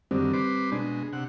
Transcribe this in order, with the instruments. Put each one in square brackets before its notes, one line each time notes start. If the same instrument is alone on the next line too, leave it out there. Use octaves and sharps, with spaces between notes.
[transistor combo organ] F#2 D3 D#3 [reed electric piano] G3 C4
[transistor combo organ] B4 C5 D6
[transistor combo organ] B2 G#3 [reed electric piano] D4
[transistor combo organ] C3 F#5